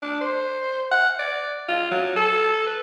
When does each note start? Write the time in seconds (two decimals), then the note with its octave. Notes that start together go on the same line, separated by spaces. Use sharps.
0.02 D4
0.21 C5
0.92 F#5
1.19 D5
1.69 F4
1.91 F#3
2.16 A4
2.66 B4